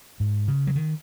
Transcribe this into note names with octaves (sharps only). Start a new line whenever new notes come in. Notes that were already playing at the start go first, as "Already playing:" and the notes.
G#2
C#3
F#3
D#3